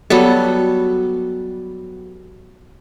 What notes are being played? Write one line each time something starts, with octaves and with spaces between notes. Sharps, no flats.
F#3 G3 B3 A4